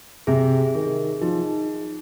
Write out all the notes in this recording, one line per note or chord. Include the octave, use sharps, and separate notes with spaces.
C3 G#4
D#3 G#4
F3 D#4